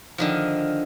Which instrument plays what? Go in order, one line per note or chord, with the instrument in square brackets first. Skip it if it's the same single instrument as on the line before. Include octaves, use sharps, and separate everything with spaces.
[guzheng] D3 D#3 F3